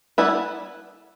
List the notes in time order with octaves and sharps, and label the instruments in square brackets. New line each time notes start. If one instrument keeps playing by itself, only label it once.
[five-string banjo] G3 B3 E4 B4